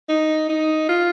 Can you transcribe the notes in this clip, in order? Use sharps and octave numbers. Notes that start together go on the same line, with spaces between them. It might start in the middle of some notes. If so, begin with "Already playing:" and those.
D#4
D#4
F4